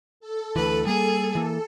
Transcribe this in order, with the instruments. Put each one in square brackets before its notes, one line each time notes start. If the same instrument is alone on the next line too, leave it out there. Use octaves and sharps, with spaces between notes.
[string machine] A4
[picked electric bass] D2 E3 [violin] B4
[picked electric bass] G3 A#3 [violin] G#4
[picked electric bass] E3 A#3